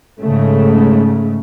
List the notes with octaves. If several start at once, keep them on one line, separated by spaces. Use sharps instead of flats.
G#2 C#3 A3